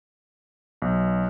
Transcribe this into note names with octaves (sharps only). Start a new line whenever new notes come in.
B1